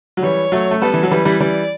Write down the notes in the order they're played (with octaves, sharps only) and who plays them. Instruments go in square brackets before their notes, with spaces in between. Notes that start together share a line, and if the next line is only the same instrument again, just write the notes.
[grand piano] F#3
[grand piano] E3 G3 [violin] C#5
[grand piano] F#3 A3
A3
[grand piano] G3 B3 [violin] A4
[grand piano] E3
F#3
[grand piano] E3 G3 [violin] B4
[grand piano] E3 G3
[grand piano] E3 G3 [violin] D5